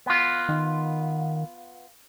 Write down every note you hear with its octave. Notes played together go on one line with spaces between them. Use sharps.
B3 F4
D#3